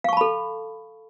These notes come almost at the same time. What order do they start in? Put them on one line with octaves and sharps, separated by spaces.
F5 C#6 A5 B5 A4